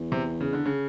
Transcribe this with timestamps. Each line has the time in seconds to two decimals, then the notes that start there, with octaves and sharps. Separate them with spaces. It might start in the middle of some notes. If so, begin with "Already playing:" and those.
Already playing: E2
0.12 C3
0.41 C#3
0.53 D3
0.66 C#3